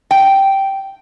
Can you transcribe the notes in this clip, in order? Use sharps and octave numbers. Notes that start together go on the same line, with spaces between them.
G5